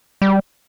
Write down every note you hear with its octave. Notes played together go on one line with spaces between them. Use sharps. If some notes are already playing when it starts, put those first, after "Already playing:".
G3